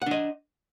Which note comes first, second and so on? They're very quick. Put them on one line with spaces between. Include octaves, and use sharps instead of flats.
F#5 D4 D#5